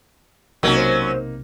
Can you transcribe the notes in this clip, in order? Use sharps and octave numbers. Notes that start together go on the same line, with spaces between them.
B1 C3 F#3 A#3 C#4 D#4 G#6
C5